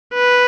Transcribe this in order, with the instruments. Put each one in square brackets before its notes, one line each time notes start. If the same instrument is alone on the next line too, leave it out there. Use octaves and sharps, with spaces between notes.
[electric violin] B4